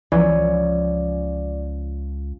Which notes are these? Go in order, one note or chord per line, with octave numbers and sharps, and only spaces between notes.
C#2 E3 F3 C#4 D5